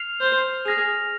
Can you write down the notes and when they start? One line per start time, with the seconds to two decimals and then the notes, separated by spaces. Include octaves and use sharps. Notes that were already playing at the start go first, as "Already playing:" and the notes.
Already playing: F6 C7 F7
0.20 C5
0.65 G#4 F6 A#6 F7